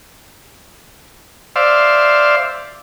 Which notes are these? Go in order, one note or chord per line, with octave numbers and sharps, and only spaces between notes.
C5 D5 E5 F5